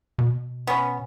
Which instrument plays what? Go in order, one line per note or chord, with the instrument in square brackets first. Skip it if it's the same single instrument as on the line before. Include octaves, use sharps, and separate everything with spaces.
[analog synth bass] B2
[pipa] B3 C#4